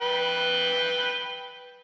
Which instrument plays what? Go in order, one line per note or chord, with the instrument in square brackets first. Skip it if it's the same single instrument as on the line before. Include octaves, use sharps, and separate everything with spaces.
[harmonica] B4 G5